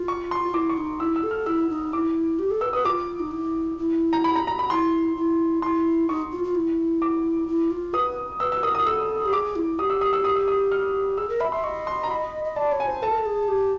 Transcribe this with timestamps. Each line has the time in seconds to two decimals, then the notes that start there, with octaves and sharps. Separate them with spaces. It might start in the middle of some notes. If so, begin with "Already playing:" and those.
Already playing: F4
0.08 C#6
0.31 C6
0.48 F4
0.54 E4 D6
0.69 C#6
0.78 D#4
1.00 E4 E6
1.16 E6
1.23 A4
1.31 F6
1.46 E4 E6
1.69 D#4
1.93 E4 D6
2.39 G4
2.51 A4
2.61 B4 E6
2.73 B4 D#6
2.85 F4 D6
3.20 D#4
3.31 E4
3.78 E4
4.13 A#5
4.24 B5
4.36 A#5
4.47 A#5
4.59 B5
4.70 E4 C6
5.17 E4
5.62 E4 C6
6.09 D#4 C#6
6.32 F4
6.44 F4
6.55 E4
7.02 D6
7.48 E4
7.71 F4
7.93 B4 D#6
8.40 B4 E6
8.52 E6
8.63 A#4 D#6
8.75 D#6
8.86 A4 E6
9.26 G4
9.33 G#4 D6
9.56 E4
9.79 G4 D#6
9.90 E6
10.01 D#6
10.13 E6
10.25 D#6
10.36 E6
10.48 D#6
10.72 F6
11.18 G#4 E6
11.29 A#4
11.40 E5 B5
11.52 E5 C6
11.64 D#5 C#6
11.87 C6
12.03 A#5
12.10 B5
12.45 D#5
12.56 D5 A5
12.72 C#5
12.80 G#5
12.87 C5
13.02 A4 A5
13.11 A#4
13.18 A4
13.26 G#4
13.48 G4